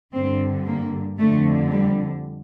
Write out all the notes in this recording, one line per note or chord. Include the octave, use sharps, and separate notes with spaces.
G2 D3 C4
A#3
F2 D3 A3
G3